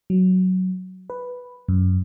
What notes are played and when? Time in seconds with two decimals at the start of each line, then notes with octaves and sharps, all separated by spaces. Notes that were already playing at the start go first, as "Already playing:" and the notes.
0.10 F#3
1.10 B4
1.69 F#2